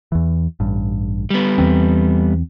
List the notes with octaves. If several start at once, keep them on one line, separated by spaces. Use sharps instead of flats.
E2 E3
A1 G2
G3 B3
E2 E3 C4